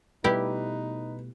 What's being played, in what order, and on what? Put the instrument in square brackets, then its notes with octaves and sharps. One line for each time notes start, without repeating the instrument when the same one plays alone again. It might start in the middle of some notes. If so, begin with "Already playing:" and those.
[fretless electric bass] B2 G3 A3 [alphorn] D#4 [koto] E4 G4 D5 [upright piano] B4